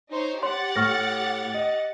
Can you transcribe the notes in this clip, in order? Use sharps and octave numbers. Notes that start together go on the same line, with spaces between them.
D#4 C5 C#5
G4 C#5 F#5 C6 A6
A2 C#6 F6 A#6
D#5